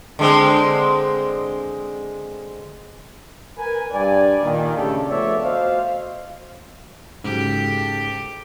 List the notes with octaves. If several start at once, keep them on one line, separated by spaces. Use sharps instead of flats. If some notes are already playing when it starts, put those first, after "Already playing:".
D3 G#3 C4
A#4 B4 G#5
G2 D5 G#5
A#2 D#3
C#3 A3 D4 G4 A4
F3 A3 B3 C#5 D5 E5
F#4 C5 D#5 F5
G#2 C#3 F#3 G4 A4